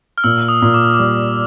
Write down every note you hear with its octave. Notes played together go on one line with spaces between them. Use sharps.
F6
A#2 E6
D#6
A#2
D6
D#6
G3 D6